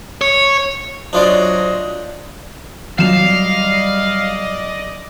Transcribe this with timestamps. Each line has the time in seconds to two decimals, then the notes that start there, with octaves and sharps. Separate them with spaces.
0.21 C#5
1.13 F#3 D4 F4 C5 D5 D#5
2.99 F#3 G3 D5 D#5 F5 E7